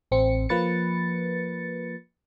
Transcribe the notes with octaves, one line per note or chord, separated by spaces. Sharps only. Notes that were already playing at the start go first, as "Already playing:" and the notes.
A1 C4 C#7
F3 A#3 B4 A6 C#7